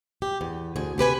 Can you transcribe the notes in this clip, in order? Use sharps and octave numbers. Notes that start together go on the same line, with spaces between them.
G4
E2
D2 G#4
C3 G4 B4 G#5